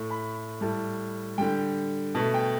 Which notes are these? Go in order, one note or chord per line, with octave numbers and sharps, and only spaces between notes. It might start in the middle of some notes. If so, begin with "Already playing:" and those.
Already playing: A2 A3
B5
A2 G3 A5
D3 G3 G5
B2 A3 A5
G5